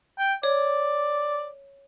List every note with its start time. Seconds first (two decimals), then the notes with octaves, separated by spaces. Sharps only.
0.18 G5
0.43 C#5 D5